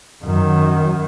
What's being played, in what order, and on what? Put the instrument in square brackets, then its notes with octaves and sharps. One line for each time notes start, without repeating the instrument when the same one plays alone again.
[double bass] F#2 D#3